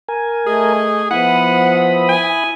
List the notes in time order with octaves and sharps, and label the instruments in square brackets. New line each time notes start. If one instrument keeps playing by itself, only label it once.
[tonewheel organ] A#4 G#5
[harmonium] A3 D#5 [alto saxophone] G#4
[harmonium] F3 B3 [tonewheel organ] E4 B5 D#6 [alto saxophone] F#5
[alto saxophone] G#5